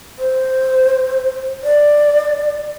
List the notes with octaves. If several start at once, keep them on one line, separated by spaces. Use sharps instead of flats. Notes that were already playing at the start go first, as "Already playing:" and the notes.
C5
D5